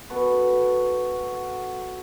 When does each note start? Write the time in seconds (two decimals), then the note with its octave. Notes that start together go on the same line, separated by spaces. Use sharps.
0.10 B3 F#4 A4 B4